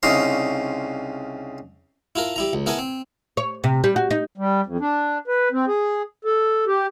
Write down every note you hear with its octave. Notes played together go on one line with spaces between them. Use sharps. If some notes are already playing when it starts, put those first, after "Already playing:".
C2 C#3 D#4 F5 C6
E4 F4 A4 A#4
G3 E4 A#5
C#2
B3 E4 A4 A#4 G#5 A5
C4
C#5
C3
G3
F#4
D#4
G3
F2
D4
B4
C4
G#4
A4
G4